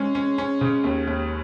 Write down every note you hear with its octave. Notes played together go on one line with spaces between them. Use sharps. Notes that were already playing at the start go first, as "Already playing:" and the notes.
Already playing: G#3 C#4
C#4
C#4
C#3
D#2
D#2